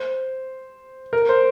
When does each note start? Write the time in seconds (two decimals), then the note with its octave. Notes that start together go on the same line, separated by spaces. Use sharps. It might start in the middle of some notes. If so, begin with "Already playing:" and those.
Already playing: C5
1.13 A#4
1.29 C5